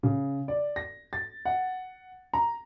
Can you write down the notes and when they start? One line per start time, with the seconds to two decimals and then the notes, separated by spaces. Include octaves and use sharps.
0.03 C#3
0.48 D5
0.76 A#6
1.13 A6
1.45 F#5
2.33 A#5